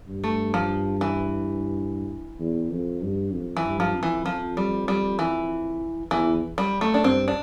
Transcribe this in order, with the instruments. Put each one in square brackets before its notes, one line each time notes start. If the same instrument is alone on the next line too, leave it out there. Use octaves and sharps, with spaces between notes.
[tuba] G2
[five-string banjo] A3
F3
E3
[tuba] E2
F2
G2
F2
[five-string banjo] E3
[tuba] G2
[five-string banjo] F3
[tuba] F2
[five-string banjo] E3
F3
G3
G3
E3
[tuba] E2 [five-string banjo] E3
[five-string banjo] G3
A3
D4
[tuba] G2 [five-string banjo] C4
[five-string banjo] D4